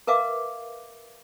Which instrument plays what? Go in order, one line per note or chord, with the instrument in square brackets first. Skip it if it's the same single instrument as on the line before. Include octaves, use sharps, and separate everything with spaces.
[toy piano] A#4 B4 E5 F5 D6